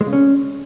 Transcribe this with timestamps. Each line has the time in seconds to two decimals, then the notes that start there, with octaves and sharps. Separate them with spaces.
0.01 G#3
0.07 C#3
0.13 C#4